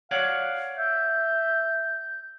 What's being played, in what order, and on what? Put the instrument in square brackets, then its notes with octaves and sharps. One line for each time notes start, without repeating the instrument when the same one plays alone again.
[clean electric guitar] C#5 D5 F#5 [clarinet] F5
[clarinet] E5 [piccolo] G6